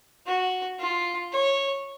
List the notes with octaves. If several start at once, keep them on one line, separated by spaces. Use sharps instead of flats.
F#4
F4
C#5